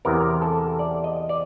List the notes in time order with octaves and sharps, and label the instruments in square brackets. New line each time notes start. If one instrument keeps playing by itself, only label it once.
[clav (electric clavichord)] E2 C3 E3 A#4
A4
D5
D#5
D5